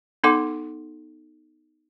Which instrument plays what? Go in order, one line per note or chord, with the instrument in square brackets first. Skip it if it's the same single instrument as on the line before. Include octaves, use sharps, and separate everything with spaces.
[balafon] B3 D#4 A4 F#5 C6 D6